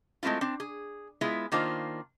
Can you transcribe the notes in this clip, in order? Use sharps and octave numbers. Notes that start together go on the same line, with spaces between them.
G#3 A3 C4 E4 F4
C4 D4
G#4
G#3 B3 E4 F4
D#3 A#3 D4 F4 C5